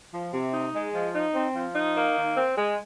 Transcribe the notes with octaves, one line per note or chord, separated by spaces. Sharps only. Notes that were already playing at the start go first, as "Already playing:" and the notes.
F3
C3
D#4
G#3
F3
D#4
C4
F3
D#4
A#3
D#3
C4
G#3